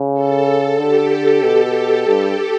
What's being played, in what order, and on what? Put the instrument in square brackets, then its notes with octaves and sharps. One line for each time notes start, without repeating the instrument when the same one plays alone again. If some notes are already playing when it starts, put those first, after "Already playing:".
Already playing: [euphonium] C#3
[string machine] A4
[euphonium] D3 [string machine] G4
[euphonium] B2
G2